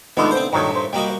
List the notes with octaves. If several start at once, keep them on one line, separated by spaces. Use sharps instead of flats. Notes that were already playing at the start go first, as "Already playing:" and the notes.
D3 D#3 G#3 A3 B3 F4
C4 C5
G2 A#2 D#3 F#3 A3 C#5
C5
G3 A#3 F#4 G4 D#5